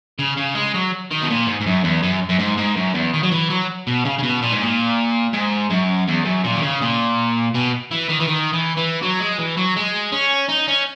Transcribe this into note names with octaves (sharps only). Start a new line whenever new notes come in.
C#3
C#3
G#3
F#3
D#3
B2
A#2
G#2
G#2
F#2
E2
F#2
F#2
G#2
G#2
F#2
E2
D#3
F#3
E3
F#3
B2
C#3
C#3
B2
A#2
G#2
A#2
G#2
F#2
E2
F#2
A#2
D#3
C#3
A#2
B2
E3
D#3
E3
D#3
E3
E3
F#3
G#3
E3
F#3
G#3
C#4
D#4
C#4